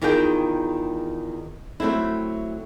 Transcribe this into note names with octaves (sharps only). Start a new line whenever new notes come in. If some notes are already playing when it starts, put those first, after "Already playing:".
E2 D#3 F4 G#4 B4 G5
F#3 A3 C4 E4